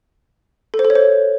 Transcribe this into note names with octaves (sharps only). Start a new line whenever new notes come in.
A4
C5
A4
C#5
C5